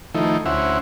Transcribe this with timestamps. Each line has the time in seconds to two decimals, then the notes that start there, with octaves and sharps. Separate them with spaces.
0.15 D#3 F3 A3 D#4 E4
0.46 D2 C#4 E4 C5 E5 F#5